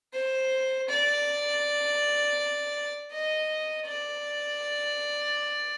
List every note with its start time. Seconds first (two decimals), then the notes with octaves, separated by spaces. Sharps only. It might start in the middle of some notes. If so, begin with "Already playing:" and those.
0.13 C5
0.89 D5
3.12 D#5
3.86 D5